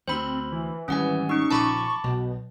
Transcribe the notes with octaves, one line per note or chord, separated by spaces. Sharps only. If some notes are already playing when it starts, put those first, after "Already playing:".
D2 C4 C5 B5
E3
G#1 C#3 G3 C#4 F#5 G#5
C#4 D#4 C#6
A#1 C#3 F3 A5 B5 D6
B1 B2